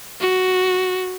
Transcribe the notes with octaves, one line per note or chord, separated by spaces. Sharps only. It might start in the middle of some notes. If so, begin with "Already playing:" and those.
F#4